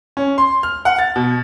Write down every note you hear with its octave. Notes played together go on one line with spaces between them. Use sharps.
C#4
C6
F6
F#5
A6
B2